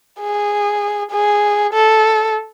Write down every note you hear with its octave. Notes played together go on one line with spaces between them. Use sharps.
G#4
G#4
A4